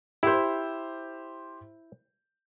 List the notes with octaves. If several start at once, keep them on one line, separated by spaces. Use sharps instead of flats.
E4 G4 C5